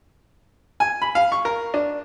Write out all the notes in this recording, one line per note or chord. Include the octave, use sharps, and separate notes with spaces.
G#5
B5
F5
C#6
A#4
D4